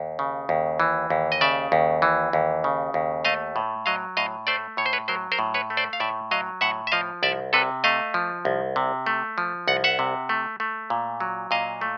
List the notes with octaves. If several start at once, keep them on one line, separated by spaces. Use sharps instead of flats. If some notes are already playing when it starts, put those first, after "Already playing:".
Already playing: D#2
C#3
D#2
E3
D#2
D#5
C#3 D5 E5
D#2
E3
D#2
C#3
D#2
A3 D#5 F5
A2
F#3 D#5 F5
A2 D#5 F5
A3 C5 D5
A2 C#5
C5
B4 C#5
F#3 A#4 C5
A#4 C5
A2
B4 C#5
A3
C5 D5
F5
A2 D5 E5
F#3 D#5 F5
A2 E5 F#5
E5
F3 D#5 F5
C2 D5 E5
C3 A4 B4
A3 D#5 F5
F3
C2
C3
A3
F3
C2 F#5
E5 F#5
C3
A3
A3
A#2
F#3
A#2 D#5 F5
A3